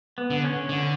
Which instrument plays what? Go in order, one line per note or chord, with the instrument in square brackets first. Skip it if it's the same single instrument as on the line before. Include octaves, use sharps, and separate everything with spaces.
[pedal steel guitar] B3
[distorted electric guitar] D3
[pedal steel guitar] C#4
[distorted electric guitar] D3